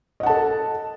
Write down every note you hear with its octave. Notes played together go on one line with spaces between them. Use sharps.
A4 D#5 F#5 A5